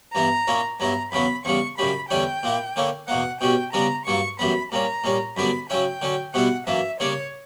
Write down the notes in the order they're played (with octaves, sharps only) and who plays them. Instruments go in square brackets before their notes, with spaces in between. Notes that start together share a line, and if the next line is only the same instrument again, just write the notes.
[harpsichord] G2 E3 B3 E4 [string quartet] A#5
[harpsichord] A#2 A#3 C#4 E4
[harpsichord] G2 F#3 B3 E4 [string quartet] A#5
[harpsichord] E2 C#3 F#3 B3 [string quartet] B5
[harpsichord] E2 C#3 G3 [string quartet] C#6
[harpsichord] F#2 C#3 G3 [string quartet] B5
[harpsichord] E2 D3 G3 C#4 E4 [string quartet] G5
[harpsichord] A#2 A#3 E4
D3 A#3 C#4 E4
[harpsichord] E2 B2 A#3 [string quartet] F#5
[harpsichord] B2 G3 C#4 [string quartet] G5
[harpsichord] C#3 G3 B3 D4 [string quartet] A#5
[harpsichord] G2 F#3 A#3 [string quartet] C#6
[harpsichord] F#2 E3 G3 B3 [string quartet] B5
[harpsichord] A#2 G3 C#4 [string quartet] A#5
[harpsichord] A#2 G3 C#4
[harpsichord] F#2 D3 G3 B3 D4 [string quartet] B5
[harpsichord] C#3 F#3 C#4 E4 [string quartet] G5
[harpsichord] D3 F#3 C#4
[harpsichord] B2 G3 B3 E4 [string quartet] F#5
[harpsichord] F#2 E3 A#3 [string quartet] E5
[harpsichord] C#3 G3 A#3 D4 [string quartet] C#5